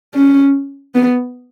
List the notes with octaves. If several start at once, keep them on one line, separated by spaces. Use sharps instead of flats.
C#4
B3